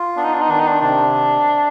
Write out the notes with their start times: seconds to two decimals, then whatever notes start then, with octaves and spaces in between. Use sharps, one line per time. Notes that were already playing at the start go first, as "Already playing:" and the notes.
Already playing: F4
0.17 B3 D4
0.24 D#4
0.33 D4
0.41 D#4
0.49 D#3 D4
0.59 D#4
0.67 D4
0.81 C3 D4